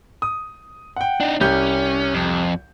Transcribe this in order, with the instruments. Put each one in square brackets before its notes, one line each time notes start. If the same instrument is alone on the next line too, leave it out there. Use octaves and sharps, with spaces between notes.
[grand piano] D#6
F#5 G5
[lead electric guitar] D4 D#4
[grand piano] C2 G4 G6 [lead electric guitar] C#4
[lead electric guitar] F2